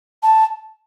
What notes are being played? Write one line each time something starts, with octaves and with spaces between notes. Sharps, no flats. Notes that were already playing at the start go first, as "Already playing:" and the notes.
A5